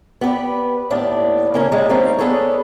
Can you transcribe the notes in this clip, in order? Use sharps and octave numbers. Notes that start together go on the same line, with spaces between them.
B3 G4 G#4 B4 D5
D#2 A2 B3 D4 D5
C#3 A#3 C#4 A#4 G#5
D2 C#3 G3 G#3 D4
G3 A#3 C4 C#4 D#4
B3 D4 G#4 A4 B4 C#5